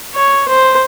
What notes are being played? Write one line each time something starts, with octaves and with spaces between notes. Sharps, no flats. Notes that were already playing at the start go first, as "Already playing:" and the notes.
C#5
C5